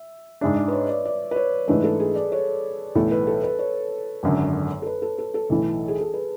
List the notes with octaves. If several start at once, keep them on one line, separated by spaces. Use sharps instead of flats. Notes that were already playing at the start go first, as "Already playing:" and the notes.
Already playing: E5
G#2 G#3 D4 E5
D5
B4
C#5
D5
D5
B4
C#5
G#2 E3 A3 D4 B4
A4
G#4
D5
C#5
B1 A2 E3 B3 A4
B4
A4
B4
C#5
G#1 F#2 D3
A4
B4
A4
A4
A4
B1 A2 E3
G#4
A4
B4